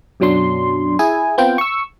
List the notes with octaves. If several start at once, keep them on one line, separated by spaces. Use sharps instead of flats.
F#2 B2 F#3 D4 C6
E4 G#4 G#5
B3 C4 F4 G5
C#6 E6